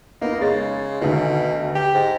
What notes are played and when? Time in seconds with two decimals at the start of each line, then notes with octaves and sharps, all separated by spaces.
0.21 A#3 B3 D#4
0.41 C#3 G#3 A6
1.02 D2 B2 D#3
1.75 G4
1.95 G#2